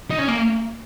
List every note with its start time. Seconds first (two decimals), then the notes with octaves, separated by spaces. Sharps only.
0.10 D#4
0.19 C#4
0.28 A#3